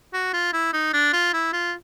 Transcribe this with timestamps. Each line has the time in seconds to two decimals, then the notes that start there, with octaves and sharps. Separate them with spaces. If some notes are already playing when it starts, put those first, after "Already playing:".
0.13 F#4
0.33 F4
0.53 E4
0.73 D#4
0.93 D4
1.13 F4
1.33 E4
1.53 F4